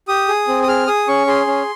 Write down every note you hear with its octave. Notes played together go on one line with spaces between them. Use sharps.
G4 D#6
G#4
C4
D#6
G#4 F6
G#4 D#6
C#4 C#6
G#4 C6
C#4